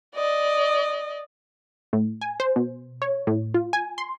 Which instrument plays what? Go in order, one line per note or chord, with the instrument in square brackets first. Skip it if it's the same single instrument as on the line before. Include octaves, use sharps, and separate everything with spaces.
[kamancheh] D5 D#5
[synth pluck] A2
G#5
C5
B2
C#5
A2
F4
G#5
C6